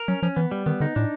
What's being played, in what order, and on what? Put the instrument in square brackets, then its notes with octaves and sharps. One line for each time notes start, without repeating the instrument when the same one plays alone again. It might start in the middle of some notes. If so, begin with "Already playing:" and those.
Already playing: [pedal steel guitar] A#4
[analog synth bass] F#3 [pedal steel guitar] C#4
[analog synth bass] F3 [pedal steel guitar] C#4
[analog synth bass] E3 [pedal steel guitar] B3
[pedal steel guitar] G3
[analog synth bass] D#3 [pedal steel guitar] B3
[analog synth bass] D3 [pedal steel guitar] D#4
[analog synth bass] A2 [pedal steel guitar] D4